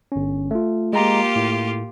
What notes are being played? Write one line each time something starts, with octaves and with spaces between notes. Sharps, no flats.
G1 C#4
A3 F4
G#3 A#3 F4 G4 A#5
A2